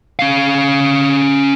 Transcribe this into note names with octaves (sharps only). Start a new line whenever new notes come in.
C#4 F5